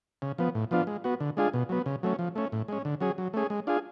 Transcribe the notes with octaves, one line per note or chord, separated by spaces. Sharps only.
C#3
F3 B3
A2
F3 B3 D4 F4
G#3
B3 F#4
D3
G#3 D4 F4 G#4
B2
F#3 B3
C#3
F#3 A3 C#4
F3
A3 C#4
A2
G#3 C#4
D3
F#3 C#4 G#4
F#3
A3 C#4 G#4
G#3
D4 F4 G#4